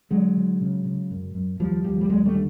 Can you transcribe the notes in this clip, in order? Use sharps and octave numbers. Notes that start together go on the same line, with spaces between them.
D3 F#3 G#3
D3
C#3
C#3
F#2
F#2
D#2 F3 G3
D#2 F3 G3
G3
D#2 F#3 G#3
G3 A3
D3